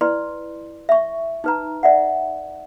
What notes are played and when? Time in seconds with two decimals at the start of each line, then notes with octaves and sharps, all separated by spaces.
0.01 E4 B4 D5 C6
0.89 E5 C#6
1.44 D#4 B4 A#5
1.83 D5 E5 F#5